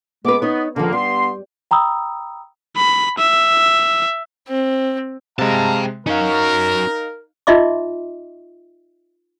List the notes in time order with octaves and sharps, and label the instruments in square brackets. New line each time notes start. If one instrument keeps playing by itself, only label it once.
[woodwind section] G#3 D6 [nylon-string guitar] B3 B4
[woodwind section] B3 [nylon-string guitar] D#4 C#5
[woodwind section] C#2 D#3 A#3 [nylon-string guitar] D3 F3
[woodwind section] G2 B3 C6 [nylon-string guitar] G3
[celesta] G5 A#5 B5 D#6 E6
[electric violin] B5
E5
[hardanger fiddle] C4
[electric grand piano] C3 G#3 [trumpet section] F5 A#5 [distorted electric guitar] G5 A5
[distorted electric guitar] C#4 F#4 [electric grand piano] D#4 F5 [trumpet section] A#4
[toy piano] D#4 F4 D#5 E5 C6 D6